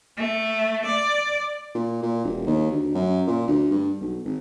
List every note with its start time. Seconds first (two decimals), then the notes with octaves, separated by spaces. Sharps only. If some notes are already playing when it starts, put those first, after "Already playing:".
0.17 A3
0.85 D5
1.75 A#2
2.03 A#2
2.25 E1
2.47 D#2
2.71 D2
2.94 F#2
3.27 A#2
3.48 D2
3.71 G2
4.01 B1
4.25 G#1